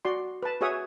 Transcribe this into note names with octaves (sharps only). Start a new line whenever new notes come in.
F#4 D5 C6
B4 A5
F#4 G#4 C#5 E5 F#5 D#6